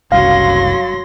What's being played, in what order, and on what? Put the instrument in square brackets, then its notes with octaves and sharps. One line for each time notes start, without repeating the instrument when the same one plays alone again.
[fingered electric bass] F#1 C2 F#2 [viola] F#3 [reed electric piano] F5 [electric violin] C6 A#6